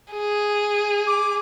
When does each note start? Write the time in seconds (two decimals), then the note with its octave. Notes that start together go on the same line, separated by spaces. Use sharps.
0.13 G#4
1.07 D6